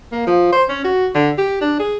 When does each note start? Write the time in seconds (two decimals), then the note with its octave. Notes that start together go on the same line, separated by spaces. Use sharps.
0.12 A#3
0.27 F3
0.52 C5
0.69 C#4
0.84 F#4
1.15 D3
1.38 G4
1.61 D4
1.79 G#4